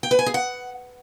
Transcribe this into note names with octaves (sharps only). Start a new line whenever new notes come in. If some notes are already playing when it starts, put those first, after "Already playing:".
G5
B4
G#5
G#4
F#5